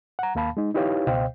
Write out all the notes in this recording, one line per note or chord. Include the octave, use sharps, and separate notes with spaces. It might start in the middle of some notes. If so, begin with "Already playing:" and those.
F#5 A#5
D#2 A#3 F5 A5 B5
G#3 D#4
D#4 E4 G4 B4 C#5 F5
C#2 B2 C5 D#5 F5 G5